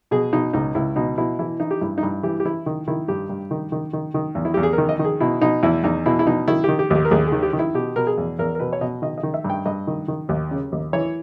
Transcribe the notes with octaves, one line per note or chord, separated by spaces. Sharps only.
B2 G#4
B2 D#4
C#2 D#4
C#2 E4
B2 D#4
B2 E4
E3 E4
E3 D#4
G4
G2 E4
D#4
G2 E4
E3 G4
G4
E3 E4
D#3
D#3 E4
G2 G4
G2
D#3
D#3
D#3
D#3
E2
E4
E2 G4
G#4
A#4
D#3
D#5
D#3
G#4
B2 E4
B2 D#4
E2 E4
E2 D#4
B2 E4
E4
B2 D#4
D#3 E4
D#3 G4
G4
D#2 G4
A#4
D#2 G#4
G#4
D#3
G4
D#3
E4
B2 G4
B2 A#4
G#4
E2
E2 A#4
A#4
B2 B4
C#5
B2 D#5
D#3 D#5
D#5
D#3
E5
G2
G5
G2 D#5
D#3
D#3
D#2
C#3
D#2
E3 C#5